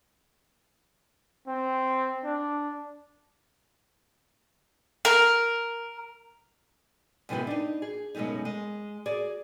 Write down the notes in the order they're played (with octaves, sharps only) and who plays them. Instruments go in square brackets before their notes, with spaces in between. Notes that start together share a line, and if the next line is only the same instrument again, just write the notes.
[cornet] C4
D4
[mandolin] A#4
[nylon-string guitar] F#2 C3 E3 G#3 B3
D4 D#4
G#4
F#2 B2 G#3 A3 D#4
G#3
F#4 G#4 D5